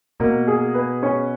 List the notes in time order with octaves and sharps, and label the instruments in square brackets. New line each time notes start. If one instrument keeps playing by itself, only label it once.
[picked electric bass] B2 [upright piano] A#3
[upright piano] G#4
B4
C#4